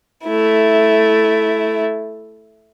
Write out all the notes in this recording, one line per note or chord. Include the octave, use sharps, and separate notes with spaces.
A3 E4